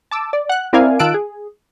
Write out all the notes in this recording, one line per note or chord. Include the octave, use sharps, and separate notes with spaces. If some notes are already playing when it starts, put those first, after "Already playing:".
A5 D6 E6
D5
F#5 F#6
C4 E4 A#4 D5 F5 G#5
D#3 F4 A5 E6 F#6 D7
G#4